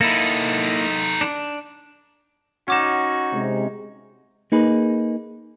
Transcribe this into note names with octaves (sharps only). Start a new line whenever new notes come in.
A#3 D#4 E4 A4
D4
C#4 D#4 F#4 F#5 D6 E7
C3 G#3
A#3 D#4 G#4 B4